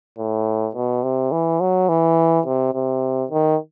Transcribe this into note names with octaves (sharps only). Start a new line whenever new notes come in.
A2
B2
C3
E3
F#3
E3
C3
C3
D#3